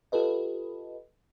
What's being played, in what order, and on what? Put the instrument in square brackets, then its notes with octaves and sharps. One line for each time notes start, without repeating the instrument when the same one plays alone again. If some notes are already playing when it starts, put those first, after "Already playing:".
[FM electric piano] F4 G4 A4 B4 D#5